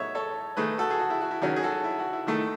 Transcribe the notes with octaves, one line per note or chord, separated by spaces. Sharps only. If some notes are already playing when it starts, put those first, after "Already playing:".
Already playing: A2 F#3 B3 D#4 C#5 D#5 E5
A4 C#5
D#3 A3 D#4 G#4 B4
F#4 A4
G#4
F#4
E4
F#4
E4
D#3 F#3 C#4 F#4
G#4
F#4 A4
E4
F#4
E4
D#3 A3 D#4 E4